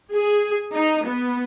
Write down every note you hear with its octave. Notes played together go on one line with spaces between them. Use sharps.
G#4
D#4
B3